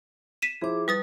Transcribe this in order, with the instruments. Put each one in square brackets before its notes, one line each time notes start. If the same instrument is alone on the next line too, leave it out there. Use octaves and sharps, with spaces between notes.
[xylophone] B6 D#7 E7
[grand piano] F3 E4 C5 [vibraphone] G#4 D6
[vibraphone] G3 [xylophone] B4 D#6 A6